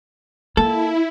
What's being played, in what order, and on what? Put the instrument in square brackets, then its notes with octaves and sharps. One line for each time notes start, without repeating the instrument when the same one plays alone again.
[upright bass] A#3 [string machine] E4 [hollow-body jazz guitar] A4